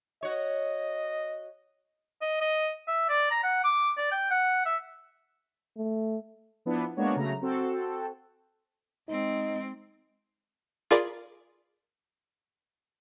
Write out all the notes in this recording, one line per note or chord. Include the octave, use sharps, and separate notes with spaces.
F#4 C#5 D#5
D#5
D#5
E5
D5
A#5
F#5
D6
D5
G5
F#5
E5
A3
F3 B3 D4 E4
G#3 A#3 B3 D4 F#4 C#5
C#3 F#3 A3 A#5
C4 F#4 A4
G#3 C4 D#4
F4 G#4 A#4 D5 B5